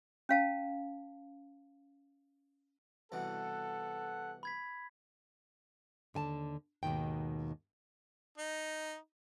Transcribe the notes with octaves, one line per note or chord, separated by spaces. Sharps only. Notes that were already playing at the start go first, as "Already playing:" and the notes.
C#4 F5 A5
C2 B2 E3 A4 F#5
B5 G#6 B6
D#2 D3 G#5 A5
D#2 G#2 B2 D#3 G5
D#4